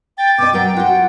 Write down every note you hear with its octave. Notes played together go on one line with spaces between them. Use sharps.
G5 A6
B2 D#5 D6
F#3 A#4 F#5 G5
F4 F#4 F#5